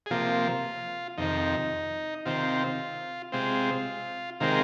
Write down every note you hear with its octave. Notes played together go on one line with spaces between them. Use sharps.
G#4
C3 F3 A#3 F4
F2 C3 D#3 D#4
C3 D#3 C4 F4
C3 G#3 C4 F4
C3 D#3 G#3 C4 F4 A#4